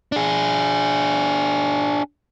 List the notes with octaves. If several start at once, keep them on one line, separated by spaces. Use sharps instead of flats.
D4 G#4